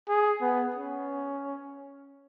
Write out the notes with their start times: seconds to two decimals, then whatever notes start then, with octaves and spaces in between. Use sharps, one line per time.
0.09 G#4
0.41 B3
0.76 C#4